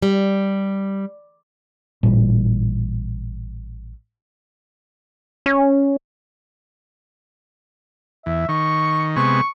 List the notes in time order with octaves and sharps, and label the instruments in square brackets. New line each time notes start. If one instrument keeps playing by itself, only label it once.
[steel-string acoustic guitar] G3
[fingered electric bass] A1 A#2 G3
[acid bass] C#4
[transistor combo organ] E2 [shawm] E5
[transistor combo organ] D#3 [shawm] C#6
[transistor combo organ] C3 G#3 B3 [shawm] C#6